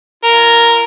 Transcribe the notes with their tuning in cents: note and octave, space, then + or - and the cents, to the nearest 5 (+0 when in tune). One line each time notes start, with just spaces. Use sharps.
F4 -40 A#4 +0